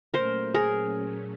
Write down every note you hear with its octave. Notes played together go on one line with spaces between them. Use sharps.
A#2 F#3 A3 C#4 A#4 C5
G#4 A#4